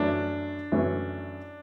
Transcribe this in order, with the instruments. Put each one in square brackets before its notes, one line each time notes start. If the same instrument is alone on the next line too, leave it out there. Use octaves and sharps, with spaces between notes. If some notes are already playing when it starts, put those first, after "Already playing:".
Already playing: [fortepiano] F#2 E3 A3 C#4 [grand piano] D4
[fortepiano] F#2 E3 A3 C#4